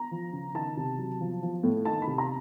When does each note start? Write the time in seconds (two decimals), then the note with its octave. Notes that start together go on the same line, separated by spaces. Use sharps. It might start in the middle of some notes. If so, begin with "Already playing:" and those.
Already playing: A#5
0.11 F3
0.33 C#3
0.55 D#3 A5
0.77 C3
0.98 F#3
1.21 F3
1.42 F3
1.63 A2
1.85 D#3 A5
2.02 B5
2.07 C3
2.18 A#5